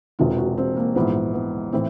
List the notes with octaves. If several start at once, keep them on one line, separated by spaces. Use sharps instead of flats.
E1 E2 C3 F4
F#4
C4
A#3
A#1 G#2 E3 B3
B3
A2 E3 C4